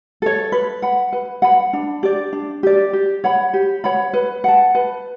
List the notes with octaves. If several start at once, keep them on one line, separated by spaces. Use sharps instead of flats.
A4 C#5
B4
F#5 B5
B4
F#5 B5
D4
G4 D5
D4
G4 D5
G4
C#5 F#5 B5
G4
C#5 F#5 B5
B4
F#5 A5
B4